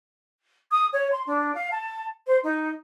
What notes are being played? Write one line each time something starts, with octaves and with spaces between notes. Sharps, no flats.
D#6
C#5
C6
D4
F5
A5
C5
D#4